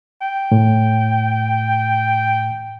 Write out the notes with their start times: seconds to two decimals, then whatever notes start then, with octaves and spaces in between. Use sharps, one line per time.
0.22 G5
0.52 A2